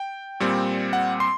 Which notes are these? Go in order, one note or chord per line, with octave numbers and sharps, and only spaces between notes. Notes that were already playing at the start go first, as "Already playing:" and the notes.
Already playing: G5
A#2 G3 C4
F#5
C6